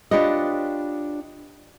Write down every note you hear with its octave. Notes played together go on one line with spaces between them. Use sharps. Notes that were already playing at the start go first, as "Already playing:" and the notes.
D4 F4 G4 B4 C#5 D#5